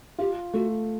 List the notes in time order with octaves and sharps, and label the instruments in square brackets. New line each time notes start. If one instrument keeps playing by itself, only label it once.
[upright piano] F4 [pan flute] G4
[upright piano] A3 [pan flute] F#4